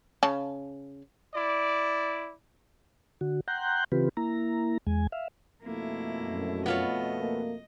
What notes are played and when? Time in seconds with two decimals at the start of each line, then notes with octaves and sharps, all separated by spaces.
0.23 C#3 A5
1.34 E4 D5
3.21 D3 F#4
3.48 F#5 G5 A#5 C6 F#6 G6
3.92 C#3 E3 C4 F4 G4 B4
4.17 A#3 E4 A#5
4.87 E2 G#3 G#5
5.12 E5 F5
5.63 F2 B2 A3 A#3 E4
6.23 F#2
6.66 B3 F4 C#5 D#5
7.20 A#3